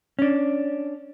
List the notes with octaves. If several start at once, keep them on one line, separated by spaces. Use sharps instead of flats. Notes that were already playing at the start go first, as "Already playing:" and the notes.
C#4 D4